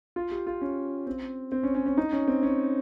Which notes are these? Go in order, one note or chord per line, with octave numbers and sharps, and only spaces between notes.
F4
G4
F4
C#4
C4
C4
C#4
C#4
C#4
D#4
C#4
C4
C#4